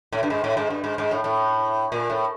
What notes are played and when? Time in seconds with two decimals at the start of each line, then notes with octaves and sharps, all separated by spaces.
0.12 A2
0.23 G2
0.30 G#2
0.44 A2
0.57 G#2
0.70 G2
0.84 G#2
0.98 G#2
1.11 A2
1.24 A2
1.92 A#2
2.10 A2